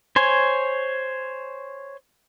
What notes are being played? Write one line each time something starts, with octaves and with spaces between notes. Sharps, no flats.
C5 C#5 G#5